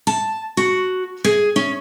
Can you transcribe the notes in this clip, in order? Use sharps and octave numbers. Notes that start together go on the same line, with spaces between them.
A5
F#4
G#4
C#4